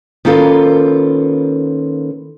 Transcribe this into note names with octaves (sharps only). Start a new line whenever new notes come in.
D#3 A#3 C#4 F4 A4 B4